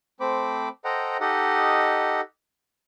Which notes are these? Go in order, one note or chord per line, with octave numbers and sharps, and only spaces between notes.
A3 C4 C5 B5 D6
A4 C5 D#5 F#5 G5 A#5
D#4 G4 A4 D#5 F#5